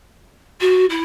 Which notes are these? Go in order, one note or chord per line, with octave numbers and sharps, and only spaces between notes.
F#4
E4